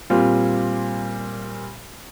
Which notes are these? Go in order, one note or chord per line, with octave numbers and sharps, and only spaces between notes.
A#2 G3 C4 F4